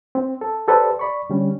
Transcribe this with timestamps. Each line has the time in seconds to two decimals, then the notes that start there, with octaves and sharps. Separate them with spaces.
0.15 C4
0.41 A4
0.68 G4 A4 B4 C5 D5
0.99 D5 B5 C#6
1.30 D3 G3 C#4